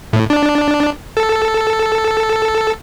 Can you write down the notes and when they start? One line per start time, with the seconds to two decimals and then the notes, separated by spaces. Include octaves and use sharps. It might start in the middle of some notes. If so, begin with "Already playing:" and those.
0.13 A2
0.30 D4
1.17 A4